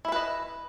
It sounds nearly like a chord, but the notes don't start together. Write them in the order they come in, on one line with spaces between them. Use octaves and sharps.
E4 E5 B4 D#5